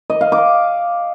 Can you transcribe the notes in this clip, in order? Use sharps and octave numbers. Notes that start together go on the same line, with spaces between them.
D#5
F5
D6